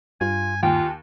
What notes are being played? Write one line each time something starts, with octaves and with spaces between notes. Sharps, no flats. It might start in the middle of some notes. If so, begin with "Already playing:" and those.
G2 F4 G#5
D#2 F4 G5 G#5